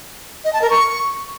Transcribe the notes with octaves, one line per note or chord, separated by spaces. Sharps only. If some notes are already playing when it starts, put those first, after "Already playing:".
D#5
A5
A#4
C#6